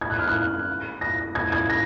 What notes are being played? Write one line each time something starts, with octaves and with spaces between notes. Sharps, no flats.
G#6
F#6
F6
F#6
A#6
G#6
G#6
A#6